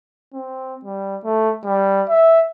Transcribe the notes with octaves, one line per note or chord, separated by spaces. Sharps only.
C4
G3
A3
G3
E5